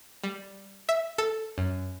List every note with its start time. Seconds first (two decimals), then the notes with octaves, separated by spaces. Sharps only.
0.24 G3
0.89 E5
1.18 A4
1.58 F#2